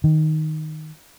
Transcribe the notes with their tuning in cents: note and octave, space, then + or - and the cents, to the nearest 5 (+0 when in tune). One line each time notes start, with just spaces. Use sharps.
D#3 +0